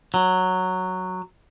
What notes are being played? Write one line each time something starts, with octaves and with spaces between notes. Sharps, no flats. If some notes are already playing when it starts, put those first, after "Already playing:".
F#3